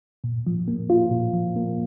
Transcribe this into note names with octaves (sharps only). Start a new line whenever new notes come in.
A#2
F3
A#3
F4
A#2
F3
A#3